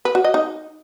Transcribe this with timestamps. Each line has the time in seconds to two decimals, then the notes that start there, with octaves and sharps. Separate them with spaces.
0.05 B4
0.15 F#4
0.24 D#5
0.34 D#4